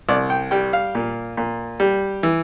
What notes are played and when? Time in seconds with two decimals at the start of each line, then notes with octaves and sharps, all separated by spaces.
0.09 C2 D5
0.30 G5
0.51 G3 G5
0.73 F5
0.95 A#2
1.37 A#2
1.80 G3
2.23 E3